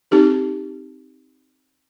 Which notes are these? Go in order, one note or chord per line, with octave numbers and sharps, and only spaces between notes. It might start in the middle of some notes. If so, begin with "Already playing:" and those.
C4 D#4 G4 A4